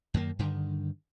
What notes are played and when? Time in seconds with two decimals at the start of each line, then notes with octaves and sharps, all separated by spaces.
0.14 F#2 D#3 A#3
0.39 G2 D3 D#3